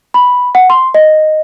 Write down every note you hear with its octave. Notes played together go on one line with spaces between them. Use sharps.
B5
F#5
C6
D#5